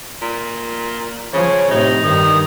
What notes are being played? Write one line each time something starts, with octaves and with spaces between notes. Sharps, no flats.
A#2
C#3 F3 C#5
A2 C3 D#4
G2 D#3 D#6